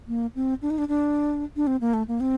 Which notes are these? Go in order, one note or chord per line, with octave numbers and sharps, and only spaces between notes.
A#3
C4
D4
D#4
D4
D4
D4
C4
A#3
A3
A#3
C4